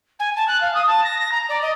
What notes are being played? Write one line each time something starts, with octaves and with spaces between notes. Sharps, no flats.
G#5
A5
F#6
F5
D#6
A5
A#6
A#6
A#5
D5
D#5